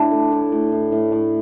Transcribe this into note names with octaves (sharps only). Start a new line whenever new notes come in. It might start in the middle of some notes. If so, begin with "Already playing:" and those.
Already playing: A2 D4 E4
A3
A2
A2
A2
A2
A2